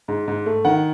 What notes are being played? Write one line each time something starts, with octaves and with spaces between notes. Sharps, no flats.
G#2
G#2
A3
D#3 F#5